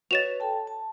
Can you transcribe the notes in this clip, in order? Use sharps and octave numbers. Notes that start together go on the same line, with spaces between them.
F#4 B4 C#5 D#5 A6 E7 F7
A4 G5 A5
A5